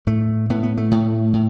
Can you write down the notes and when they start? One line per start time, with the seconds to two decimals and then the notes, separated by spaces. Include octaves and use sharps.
0.07 A2 A3
0.50 A2 B3
0.63 B3
0.77 A3
0.91 A2
1.33 A2